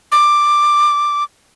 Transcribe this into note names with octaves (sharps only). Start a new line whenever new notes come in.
D6